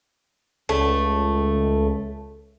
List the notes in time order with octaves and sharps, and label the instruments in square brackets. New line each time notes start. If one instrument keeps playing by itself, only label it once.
[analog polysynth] C#2 [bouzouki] A3